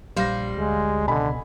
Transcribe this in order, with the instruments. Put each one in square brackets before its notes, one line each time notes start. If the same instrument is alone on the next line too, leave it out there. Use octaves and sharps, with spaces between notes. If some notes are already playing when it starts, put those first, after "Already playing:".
[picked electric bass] A#1 [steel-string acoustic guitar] G3 C5 [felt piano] F5 A#6
[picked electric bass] D2 [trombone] G#3
[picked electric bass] C#2 B2 [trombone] D3 [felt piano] D#5 G#5 B5